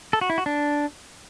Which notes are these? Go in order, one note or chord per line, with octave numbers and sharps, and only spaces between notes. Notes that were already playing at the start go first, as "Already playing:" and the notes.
A4
F#4
E4
F#4
D4